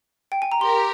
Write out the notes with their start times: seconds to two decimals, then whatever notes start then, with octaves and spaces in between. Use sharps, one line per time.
0.32 G5
0.42 G#5
0.52 A#5
0.61 G4 A#4 C6